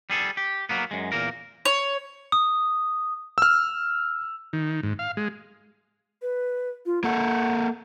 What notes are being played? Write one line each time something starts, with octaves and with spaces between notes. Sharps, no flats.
G3 G#4 A4
G4
F#3 A#3 B3
F#2 G#3
E2 A#2 A#3 A#4
C#5
D#6
E6 F6
D#3
G#2
F5
G#3
B4
F4
A#3 A4 F#5